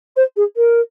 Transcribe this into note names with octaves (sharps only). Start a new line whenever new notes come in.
C5
G#4
A#4